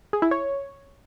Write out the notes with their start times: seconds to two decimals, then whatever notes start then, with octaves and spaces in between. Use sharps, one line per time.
0.13 G#4
0.22 E4
0.31 C#5